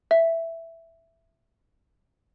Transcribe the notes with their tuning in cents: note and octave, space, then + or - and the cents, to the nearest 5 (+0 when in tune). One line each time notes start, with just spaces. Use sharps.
E5 +5